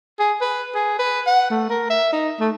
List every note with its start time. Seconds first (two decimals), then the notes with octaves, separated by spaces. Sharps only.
0.19 G#4
0.41 B4
0.75 G#4
0.99 B4
1.27 F#5
1.50 A3
1.70 A#4
1.90 E5
2.12 D#4
2.40 A3